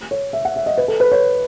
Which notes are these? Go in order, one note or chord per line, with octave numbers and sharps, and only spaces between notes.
C#5
E5
F#5
E5
D#5
B4
A4
B4
C#5